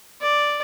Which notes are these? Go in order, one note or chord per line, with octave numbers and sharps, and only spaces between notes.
D5